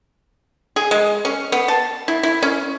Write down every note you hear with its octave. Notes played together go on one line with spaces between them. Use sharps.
G#4
G#3
C#4
B3
A5
E4
E4
C#4